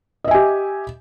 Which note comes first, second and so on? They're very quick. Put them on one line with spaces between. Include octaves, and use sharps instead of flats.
D#5 E5 G#5 G4